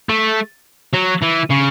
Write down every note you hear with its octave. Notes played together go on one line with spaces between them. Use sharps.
A3
F#3
E3
C#3